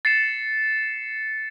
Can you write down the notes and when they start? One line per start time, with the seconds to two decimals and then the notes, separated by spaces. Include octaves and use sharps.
0.05 A6 C7 C#7 E7